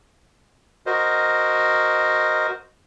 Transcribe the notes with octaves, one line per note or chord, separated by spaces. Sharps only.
F#4 A#4 C5 D#5